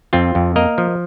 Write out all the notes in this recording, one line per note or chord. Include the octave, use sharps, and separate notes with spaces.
F2 C4 F4
F2
A#3 A#4 D#5
F3